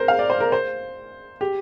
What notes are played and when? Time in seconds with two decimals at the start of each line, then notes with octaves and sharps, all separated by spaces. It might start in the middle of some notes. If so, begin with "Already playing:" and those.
Already playing: A#4 C5
0.08 F5
0.19 D5
0.30 C5
0.40 A#4
0.52 C5
1.41 G4